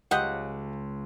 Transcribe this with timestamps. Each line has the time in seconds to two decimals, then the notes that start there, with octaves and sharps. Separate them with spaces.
0.11 C#2 G4 D#5 F#5